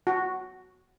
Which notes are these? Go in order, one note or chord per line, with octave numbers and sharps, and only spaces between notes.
F#4